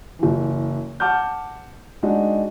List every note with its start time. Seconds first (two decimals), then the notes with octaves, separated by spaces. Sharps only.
0.19 F#1 E3
1.00 F#5 A5 D6 F6 G6
2.03 G#3 D4 D#4 F#4